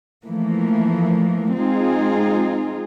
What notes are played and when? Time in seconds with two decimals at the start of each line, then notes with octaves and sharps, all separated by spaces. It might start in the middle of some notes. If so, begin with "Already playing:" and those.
0.25 E3 F3 A3 A#3
1.55 G#3 C4 D#4 F4 G#4